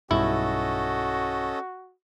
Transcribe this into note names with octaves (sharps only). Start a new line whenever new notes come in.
B1 G2 C#4 E4 F#4 A4 D#5